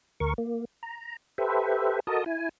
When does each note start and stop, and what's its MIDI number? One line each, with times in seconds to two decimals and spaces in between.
0.20 0.34 38
0.20 0.34 70
0.20 0.34 85
0.38 0.65 58
0.83 1.16 82
1.38 2.00 67
1.38 2.00 69
1.38 2.00 71
1.38 2.00 72
1.38 2.00 76
2.07 2.24 66
2.07 2.24 69
2.07 2.24 70
2.07 2.24 75
2.07 2.24 81
2.07 2.24 87
2.26 2.49 64
2.26 2.49 80